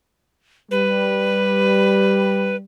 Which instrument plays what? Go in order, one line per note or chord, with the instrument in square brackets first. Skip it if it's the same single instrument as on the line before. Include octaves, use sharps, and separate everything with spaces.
[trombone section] G3 [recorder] B4